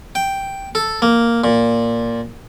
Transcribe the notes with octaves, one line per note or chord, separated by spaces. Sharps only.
G5
A4
A#3
A#2